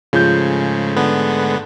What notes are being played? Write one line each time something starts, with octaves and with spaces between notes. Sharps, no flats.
G#2 C#3 F3 G#3 A3 G6
D3 B3